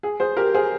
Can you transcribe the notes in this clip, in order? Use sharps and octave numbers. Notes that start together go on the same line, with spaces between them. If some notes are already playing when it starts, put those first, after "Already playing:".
G#4
G#4 C5
G4 A#4
G#4 C5